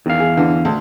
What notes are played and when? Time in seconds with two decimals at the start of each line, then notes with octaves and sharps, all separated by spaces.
0.06 E2 D#3 F5
0.19 G#4
0.37 D3 E3
0.65 D2